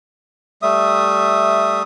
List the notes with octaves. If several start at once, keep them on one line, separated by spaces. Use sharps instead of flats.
G3 A3 E5 D#6